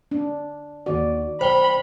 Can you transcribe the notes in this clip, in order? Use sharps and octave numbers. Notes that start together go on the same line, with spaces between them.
D4
D#2 D#3 F#4 D5
B1 C5 G5 B5 G7